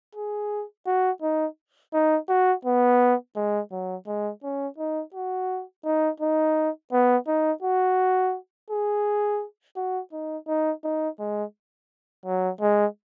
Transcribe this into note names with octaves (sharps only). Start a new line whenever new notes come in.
G#4
F#4
D#4
D#4
F#4
B3
G#3
F#3
G#3
C#4
D#4
F#4
D#4
D#4
B3
D#4
F#4
G#4
F#4
D#4
D#4
D#4
G#3
F#3
G#3